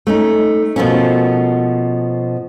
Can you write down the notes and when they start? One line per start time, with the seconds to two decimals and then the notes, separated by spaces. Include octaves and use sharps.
0.07 A3 C#4 D#4
0.76 B2 F3 A3 A#3 C#4